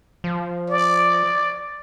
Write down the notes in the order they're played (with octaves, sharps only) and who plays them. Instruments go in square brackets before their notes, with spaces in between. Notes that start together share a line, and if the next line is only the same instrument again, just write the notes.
[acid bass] F3
[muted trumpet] D5